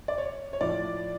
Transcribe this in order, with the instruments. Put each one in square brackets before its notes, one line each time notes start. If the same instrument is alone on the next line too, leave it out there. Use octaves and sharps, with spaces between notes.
[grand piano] D5
C#5
C#5
A2 F3 D5